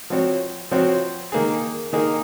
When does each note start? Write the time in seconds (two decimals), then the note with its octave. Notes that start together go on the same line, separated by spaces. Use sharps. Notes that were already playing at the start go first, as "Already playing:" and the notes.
0.10 F3 C4 F#4 C#5
0.71 F3 C4 F#4 C#5
1.32 D#3 A#3 D#4 G#4
1.93 D#3 A#3 D#4 G#4